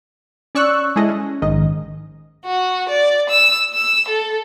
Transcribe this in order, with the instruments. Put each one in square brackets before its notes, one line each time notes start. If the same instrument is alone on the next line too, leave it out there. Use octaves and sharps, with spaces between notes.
[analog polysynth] C#4 D5 C#6 E6 F#6
G#3 C#4 E4 G#4 A4 D#5
C#4
A#1 G#2 D#3 D#5
[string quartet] F#4
D5
E6
E6
A4